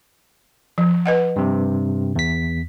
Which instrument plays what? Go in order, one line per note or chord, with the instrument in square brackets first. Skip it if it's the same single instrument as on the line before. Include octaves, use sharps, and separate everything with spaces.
[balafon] F3
B4 D#5 F#5
[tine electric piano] G2 C3
E2 B6